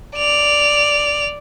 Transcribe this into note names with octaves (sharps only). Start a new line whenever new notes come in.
D5 F7